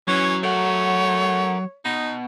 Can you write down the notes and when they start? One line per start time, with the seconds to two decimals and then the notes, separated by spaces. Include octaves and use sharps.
0.08 E3 F#3 C#4 C#5
0.43 A3 A#4 C#5 F#5
1.85 B2 D#4